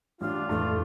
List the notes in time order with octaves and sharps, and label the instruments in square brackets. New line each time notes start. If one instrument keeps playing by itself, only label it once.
[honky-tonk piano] A1 [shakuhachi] D4 [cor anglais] F4
[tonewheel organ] F2 A2 A4 [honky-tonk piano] E3 A3 [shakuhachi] D4